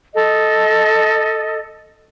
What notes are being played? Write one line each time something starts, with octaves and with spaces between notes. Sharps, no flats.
A4 D#5